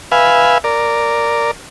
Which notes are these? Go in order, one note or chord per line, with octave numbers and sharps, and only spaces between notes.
B4 E5 F5 G#5
A#4 D5